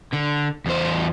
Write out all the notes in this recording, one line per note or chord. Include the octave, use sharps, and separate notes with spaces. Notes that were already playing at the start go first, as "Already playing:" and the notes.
D3
E2 C5